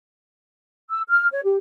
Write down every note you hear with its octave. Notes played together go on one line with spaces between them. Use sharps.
E6
F6
C#5
G4